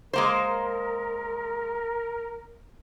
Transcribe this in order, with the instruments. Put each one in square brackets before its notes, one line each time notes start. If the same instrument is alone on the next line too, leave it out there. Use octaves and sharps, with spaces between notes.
[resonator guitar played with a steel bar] G#3 A#3 C5 [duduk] A#4